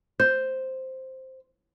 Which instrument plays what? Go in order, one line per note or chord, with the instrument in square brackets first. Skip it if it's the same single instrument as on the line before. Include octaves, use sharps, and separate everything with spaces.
[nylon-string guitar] C5 [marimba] G6